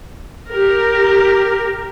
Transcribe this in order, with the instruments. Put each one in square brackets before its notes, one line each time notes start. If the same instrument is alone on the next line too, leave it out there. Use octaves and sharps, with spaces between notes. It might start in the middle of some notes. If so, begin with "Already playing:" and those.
[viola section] G4 A#4